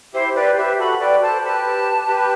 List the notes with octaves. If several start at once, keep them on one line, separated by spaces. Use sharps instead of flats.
E4 G4 C5
G4 B4 D5
G4 B4 E5
F#4 A4 B5
B4 D5 G5
A4 C5 A5
G4 B4 A5
G4 B4